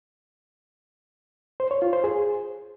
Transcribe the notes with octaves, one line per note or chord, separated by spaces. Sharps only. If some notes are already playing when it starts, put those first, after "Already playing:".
C5
C#5
F4
C5
G#4